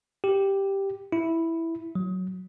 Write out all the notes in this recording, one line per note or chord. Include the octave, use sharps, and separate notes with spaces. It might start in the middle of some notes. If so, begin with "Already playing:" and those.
G4
E4
F#3